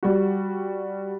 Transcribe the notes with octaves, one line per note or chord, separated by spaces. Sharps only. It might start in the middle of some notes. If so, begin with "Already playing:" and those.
G3 F#4